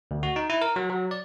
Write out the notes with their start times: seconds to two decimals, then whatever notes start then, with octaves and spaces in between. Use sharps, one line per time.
0.11 D2
0.23 F#4
0.36 D#4
0.50 E4
0.61 A#4
0.76 F#3
0.89 F#3
1.11 D5